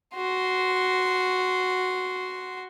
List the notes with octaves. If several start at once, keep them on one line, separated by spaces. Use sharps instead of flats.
F#4 C6